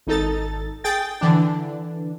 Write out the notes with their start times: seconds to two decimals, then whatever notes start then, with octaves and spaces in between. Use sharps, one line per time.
0.07 G#1 D#4 A4 A6
0.84 G#4 G5 A6
1.21 D3 E3 D4